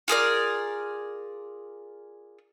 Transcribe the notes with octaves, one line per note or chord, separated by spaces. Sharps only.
F4 G#4 A#4 D5